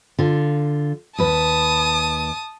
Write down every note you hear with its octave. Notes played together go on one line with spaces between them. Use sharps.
D3 F4
D#2 B4 A5 D#6